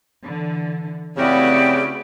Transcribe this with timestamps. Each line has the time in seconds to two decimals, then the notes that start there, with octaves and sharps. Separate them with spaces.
0.24 D3 E3
1.17 C#3 A3 C4 E4 F#4 G4 B4 D5